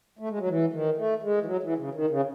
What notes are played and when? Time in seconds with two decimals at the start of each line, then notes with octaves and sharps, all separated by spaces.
0.19 A3
0.29 G#3
0.39 F#3
0.48 E3
0.73 D#3
0.97 A3
1.22 G#3
1.41 E3
1.46 F#3
1.63 E3
1.78 C#3
1.95 D#3
2.10 C#3